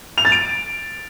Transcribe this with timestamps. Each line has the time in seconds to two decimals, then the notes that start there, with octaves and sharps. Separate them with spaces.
0.18 F7
0.25 A6
0.32 D7